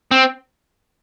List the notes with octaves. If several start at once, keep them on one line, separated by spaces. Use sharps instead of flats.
C4